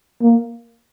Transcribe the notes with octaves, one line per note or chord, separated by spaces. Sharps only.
A#3